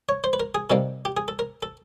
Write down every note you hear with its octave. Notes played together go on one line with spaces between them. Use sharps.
C#5
C5
B4
A#4
G#4
C3 D#3 G3 A#3 A4
G4
G#4
A4
A#4
A4